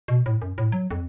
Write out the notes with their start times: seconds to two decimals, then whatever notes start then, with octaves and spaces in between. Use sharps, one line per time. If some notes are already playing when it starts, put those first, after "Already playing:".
0.08 B2
0.26 A2
0.42 F#2
0.58 A2
0.72 F#3
0.91 F2